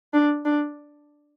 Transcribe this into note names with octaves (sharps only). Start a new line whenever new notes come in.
D4
D4